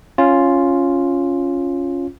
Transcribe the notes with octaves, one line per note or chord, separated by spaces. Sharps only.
C#4 F4